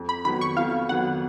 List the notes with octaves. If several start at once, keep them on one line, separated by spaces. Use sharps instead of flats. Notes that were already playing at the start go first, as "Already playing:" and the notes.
Already playing: F2
B5
D#3 F#3 B3 B5
C#6
F2 F5
D#3 F#3 B3 F#5